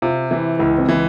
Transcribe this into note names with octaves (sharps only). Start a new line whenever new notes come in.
C3 F4
E3 E4
C#2 E4
C4
E3